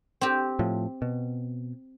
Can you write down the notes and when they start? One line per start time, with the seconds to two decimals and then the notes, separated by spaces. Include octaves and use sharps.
0.21 C4 G4
0.59 A2 F3
1.02 B2